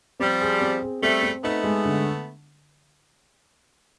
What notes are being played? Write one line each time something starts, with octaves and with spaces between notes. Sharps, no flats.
F3 G3 C4
G#4
C4
G#4
G3 A3 C4
C4
A3 B3 D#4
G#3
D3